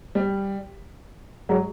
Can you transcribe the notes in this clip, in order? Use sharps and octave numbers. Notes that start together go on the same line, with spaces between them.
G3
F#3 G#3